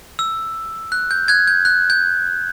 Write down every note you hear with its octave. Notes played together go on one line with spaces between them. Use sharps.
E6
F#6
G6
F#6 G#6
G6
F#6
G6